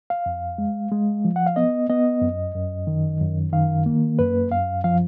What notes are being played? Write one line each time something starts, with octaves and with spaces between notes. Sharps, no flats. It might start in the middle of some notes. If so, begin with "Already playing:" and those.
F5
F2
G#3
G#3
F3
F#5
F5
B3 D#5
B3 D#5
F#2
F#2
D#3
F#2
D#3 F5
A#3
F#2 B4
F#2 F5
F3 F5